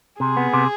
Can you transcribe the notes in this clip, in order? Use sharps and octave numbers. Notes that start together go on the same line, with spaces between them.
C3 G#4
B3
C3